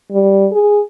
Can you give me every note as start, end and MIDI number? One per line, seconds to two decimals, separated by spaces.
0.12 0.47 55
0.52 0.81 68